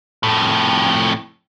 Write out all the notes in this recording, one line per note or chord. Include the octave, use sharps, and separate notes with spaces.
F2 A2